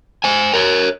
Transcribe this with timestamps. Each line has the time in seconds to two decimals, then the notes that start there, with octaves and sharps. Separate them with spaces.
0.24 C5 G#5
0.54 A#4 C#5